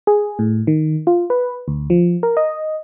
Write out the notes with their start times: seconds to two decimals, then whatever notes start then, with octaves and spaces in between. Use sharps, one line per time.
0.07 G#4
0.39 A2
0.67 D#3
1.07 F4
1.30 B4
1.68 D2
1.90 F3
2.23 A#4
2.37 D#5